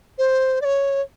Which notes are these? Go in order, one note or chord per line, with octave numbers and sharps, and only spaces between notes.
C5
D5
C#5